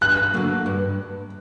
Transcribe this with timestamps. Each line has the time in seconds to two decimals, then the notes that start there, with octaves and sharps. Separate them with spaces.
0.01 G2 F#6
0.34 D3 F#3 A#3
0.66 G2